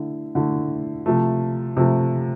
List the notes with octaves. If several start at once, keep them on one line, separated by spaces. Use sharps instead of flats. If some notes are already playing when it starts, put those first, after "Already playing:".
Already playing: D3 A3 E4
D3 A3 E4
C3 F3 A3
C3 F3 A3